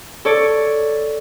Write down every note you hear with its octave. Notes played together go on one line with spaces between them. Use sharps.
A4 C#5 D5